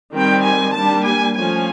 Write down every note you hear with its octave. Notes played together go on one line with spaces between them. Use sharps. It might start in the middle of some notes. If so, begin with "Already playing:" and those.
D#3 G3 C4 G5
G#5
G3 A#3 D4 A5
G#5
F3 A3 C#4 G#5